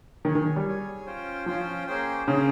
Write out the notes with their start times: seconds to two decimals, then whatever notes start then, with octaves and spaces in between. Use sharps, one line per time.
0.25 D#3 G#4 C#5 G#5
0.35 D#3
0.56 G3
0.65 G#4 C#5 G#5
1.06 C#4 F4 C5 G5
1.46 F3 C#4 F4 C5 G5
1.87 A#3 C#4 G#4 C5 G5
2.27 C#3 A#3 C#4 G#4 C5 G5